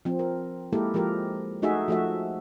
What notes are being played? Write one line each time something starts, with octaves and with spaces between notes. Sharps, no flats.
F3 C4
A#4
G#3 A#3 E4 G4 A4 A#4
F3 G#3 G4 A#4
A3 D#4 F#4 G#4 E5
F3 A3 F#4 E5